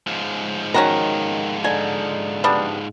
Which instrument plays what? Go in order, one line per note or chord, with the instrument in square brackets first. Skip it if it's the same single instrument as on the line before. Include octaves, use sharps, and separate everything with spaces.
[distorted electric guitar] G#2 F3
[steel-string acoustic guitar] D#3 [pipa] C#4 F#4 A#5
[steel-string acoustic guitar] D3 D#4 [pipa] G#5
[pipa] G3 B3 D4